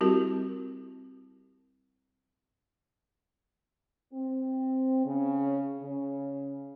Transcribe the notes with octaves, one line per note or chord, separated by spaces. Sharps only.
G3 C4 E4 F#4 G4 A#4
C4
C#3
C#3